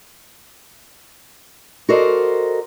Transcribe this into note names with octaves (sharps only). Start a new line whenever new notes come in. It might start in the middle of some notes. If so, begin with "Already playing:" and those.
F#4 A4 A#4 C5 D5 D#5